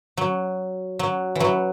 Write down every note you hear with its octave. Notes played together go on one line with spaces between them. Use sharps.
F#3
F#3
E3 F#3